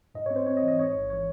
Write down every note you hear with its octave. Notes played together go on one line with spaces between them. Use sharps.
G#2 D#5
C4 C#5
C5
C4 C#5
D#5
E3
D#5
G#2 C#5
A1
E3 C#5